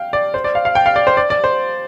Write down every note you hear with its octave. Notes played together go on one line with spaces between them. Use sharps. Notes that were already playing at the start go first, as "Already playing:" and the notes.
Already playing: F5 G5
D5
C5
D5
F5
F5
G5
F5
D5
C5
D5
D5
C5